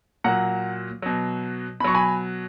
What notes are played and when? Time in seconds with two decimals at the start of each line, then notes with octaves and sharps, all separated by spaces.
0.24 A#2 F#3 F#5 A#5
1.02 B2 F#3
1.80 B2 B5
1.84 F#3 C#6
1.94 G#5 B5